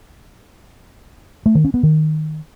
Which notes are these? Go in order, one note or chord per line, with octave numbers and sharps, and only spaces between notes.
A3
D#3
C#4
B3
D#3